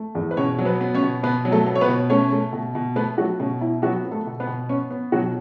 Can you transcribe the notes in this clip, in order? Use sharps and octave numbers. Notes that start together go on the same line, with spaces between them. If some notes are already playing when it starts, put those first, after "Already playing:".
Already playing: A3
E2
B4
B2 C#4 C#5
F#3
B3 B4
B3
C#4 C#5
B2
B2 B3 B4
F#3
A3 A4
B3
C#5
B3 B4
B2
A3 C#4 C#5
A3
B2
B2
A3 B3 B4
F#3 A3 F#4
B2 C#4
B2 E4
F#3 B3 F#4
B3
A3 A4
B2
B3 B4
B2
B3 C#4 C#5
B3
B2 F#3 F#4